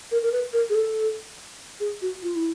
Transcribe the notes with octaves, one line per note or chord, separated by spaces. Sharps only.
A#4
A#4
B4
A#4
G#4
A4
G#4
F#4
F4
E4